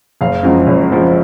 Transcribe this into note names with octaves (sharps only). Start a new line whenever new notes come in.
F#1 F5
F#2 C#3 F3 G#3
F#1
F#2 C#3 F3 G#3